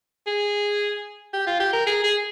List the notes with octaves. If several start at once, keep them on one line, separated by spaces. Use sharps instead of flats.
G#4
G4
F4
G4
A#4
G#4
G#4